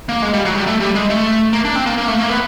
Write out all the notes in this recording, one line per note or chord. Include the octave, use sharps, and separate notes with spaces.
A#3
G#3
G3
F#3
G3
A3
G3
G#3
A3
A#3
D4
C4
A#3
A#3
A3
A#3
B3